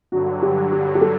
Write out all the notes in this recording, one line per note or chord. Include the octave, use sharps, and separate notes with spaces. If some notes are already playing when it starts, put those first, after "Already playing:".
G2 D3 F#3 F#4
G4
G4
G4
A4